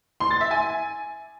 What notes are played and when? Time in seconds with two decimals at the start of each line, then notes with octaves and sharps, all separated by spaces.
0.20 C6
0.31 A6
0.41 E5
0.51 G#5